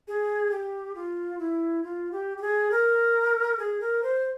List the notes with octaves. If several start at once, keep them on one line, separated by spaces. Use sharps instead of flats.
G#4
G4
F4
E4
F4
G4
G4
G#4
A#4
G#4
A#4
C5